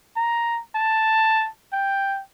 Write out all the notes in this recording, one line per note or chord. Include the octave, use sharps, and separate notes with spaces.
A#5
A5
G5